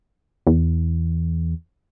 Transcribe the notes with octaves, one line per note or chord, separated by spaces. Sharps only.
E2